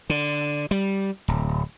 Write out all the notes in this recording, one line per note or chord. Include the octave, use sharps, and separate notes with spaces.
D3
G3
D1